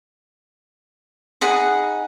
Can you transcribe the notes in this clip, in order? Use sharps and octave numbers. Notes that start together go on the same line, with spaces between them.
D#4 G#4 F#5 B5